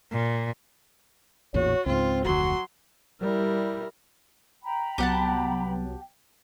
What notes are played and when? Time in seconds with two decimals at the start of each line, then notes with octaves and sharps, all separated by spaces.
0.12 A#2
1.54 A1 E2 A#2 F#4 C#5
1.86 C#2 G#2 C4 F4
2.25 F1 D2 F#3 F#4 C6
3.21 G3 E4 A#4
4.63 G5 A#5 B5
4.98 C2 F#3 B3 G4 F#5 A5